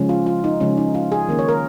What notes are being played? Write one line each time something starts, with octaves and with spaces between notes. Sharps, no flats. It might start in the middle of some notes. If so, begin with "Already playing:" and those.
Already playing: C#3 F3 G#3 C#4
F4
F4
D#4
C#3 F3 G#3 C#4
D#4
F4
G#4
D#3 A#3 C#4
C#5
A#4